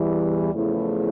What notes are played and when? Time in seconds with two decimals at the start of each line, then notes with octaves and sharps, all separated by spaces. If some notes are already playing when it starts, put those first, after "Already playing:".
Already playing: E2 E3 G3
0.53 E2 C#3 F3 A3 E4